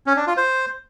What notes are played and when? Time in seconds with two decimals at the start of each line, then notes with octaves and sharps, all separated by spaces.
0.06 C#4
0.17 D4
0.27 F4
0.37 C5